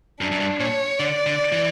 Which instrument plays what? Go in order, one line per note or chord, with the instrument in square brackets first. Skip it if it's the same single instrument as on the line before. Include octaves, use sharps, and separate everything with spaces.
[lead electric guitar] F#2 [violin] D4
[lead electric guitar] F#2
G2
[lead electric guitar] A#2 [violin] C#5
[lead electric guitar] D3 [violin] D5
[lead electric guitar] D3
E3